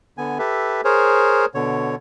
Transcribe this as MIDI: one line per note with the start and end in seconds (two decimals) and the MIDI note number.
0.18 0.38 50
0.18 0.38 59
0.18 0.38 80
0.39 0.81 67
0.39 0.81 69
0.39 0.81 71
0.39 0.81 76
0.84 1.45 68
0.84 1.45 70
0.84 1.45 72
0.84 1.45 73
1.55 1.95 47
1.55 1.95 50
1.55 1.95 73